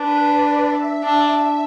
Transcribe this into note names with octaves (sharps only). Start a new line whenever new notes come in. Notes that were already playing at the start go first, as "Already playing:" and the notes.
Already playing: D4 B4
D5
E5
D4 E5